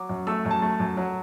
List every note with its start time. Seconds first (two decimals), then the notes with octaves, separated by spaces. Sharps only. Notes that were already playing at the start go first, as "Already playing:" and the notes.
Already playing: F#3 D6
0.09 F#2
0.27 A3 E6
0.45 F#2
0.51 A5
0.62 A3
0.80 F#2
0.97 F#3